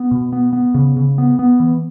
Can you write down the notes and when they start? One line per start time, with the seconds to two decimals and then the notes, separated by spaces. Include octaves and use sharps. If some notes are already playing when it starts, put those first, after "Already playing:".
Already playing: B3
0.11 B2
0.33 B3
0.53 B3
0.74 C#3
0.96 C#3
1.18 B3
1.39 B3
1.60 E3